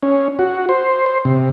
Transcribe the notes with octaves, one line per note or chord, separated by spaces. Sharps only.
C#4
F#4
C5
C5
C3